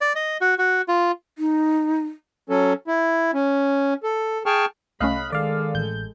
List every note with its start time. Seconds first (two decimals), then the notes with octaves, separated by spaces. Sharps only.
0.01 D5
0.15 D#5
0.41 F#4
0.58 F#4
0.88 F4
1.38 D#4
2.49 F#3 C#4 A4
2.88 E4
3.34 C#4
4.03 A4
4.46 G#4 G5 A5 C#6 F6
5.00 C2 A3 C#4 D#5 F5 B5 F#6
5.32 D#3 G#3 A4 D5 F5
5.75 A1 G6